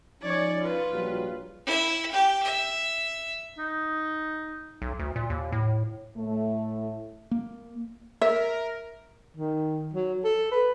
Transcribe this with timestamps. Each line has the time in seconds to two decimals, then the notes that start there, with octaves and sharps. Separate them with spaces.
0.22 F3 C#4 D#4 C#5 D5
0.61 F4 B4
0.92 A#1 G2 F#3
1.66 E4 E5
2.11 G4 G5
2.43 E5
3.59 D#4
4.82 B1
4.99 D2
5.16 A#2
5.30 D#2
5.52 A2
6.17 A2 A3
7.31 A#3
8.21 A#4 E5
9.37 D#3
9.94 F#3
10.24 A4
10.51 B4